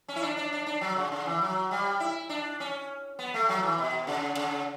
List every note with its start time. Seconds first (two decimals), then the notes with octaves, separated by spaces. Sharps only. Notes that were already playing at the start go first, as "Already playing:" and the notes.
0.08 C#4
0.16 E4
0.22 D4
0.37 D4
0.53 D4
0.67 D4
0.81 F#3
0.96 C#3
1.12 C#3
1.26 E3
1.41 F#3
1.71 G3
2.00 E4
2.29 D4
2.60 C#4
3.19 B3
3.34 A3
3.49 F#3
3.63 E3
3.78 B2
4.07 C#3
4.37 C#3